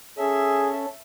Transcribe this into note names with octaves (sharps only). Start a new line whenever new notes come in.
C#4 G#4 A4 E5